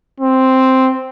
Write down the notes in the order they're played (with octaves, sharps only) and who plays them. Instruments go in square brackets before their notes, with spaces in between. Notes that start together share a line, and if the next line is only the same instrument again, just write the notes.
[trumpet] C4